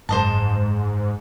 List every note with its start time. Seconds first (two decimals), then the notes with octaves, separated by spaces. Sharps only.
0.09 F#1 G#2 C5 D#5 A5